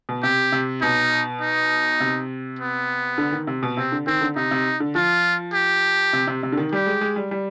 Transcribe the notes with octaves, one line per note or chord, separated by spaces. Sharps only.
B2
C3 G4
C3
B2 D#4
D#4
C3
B3
D3
D#3
C3
B2
C3 C4
D3
D#3 C4
D3
C3 D#4
C3
D3
F3 F4
G4
C3
C3
C3
D3
D#3
G3 G4
G#3
G#3
G3
G3